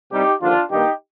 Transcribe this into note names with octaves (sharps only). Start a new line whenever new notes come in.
C2 C3 G3 D#4 G4
D#2 D3 F3 D4 F4
G2 D#3 A#3 D#4 G4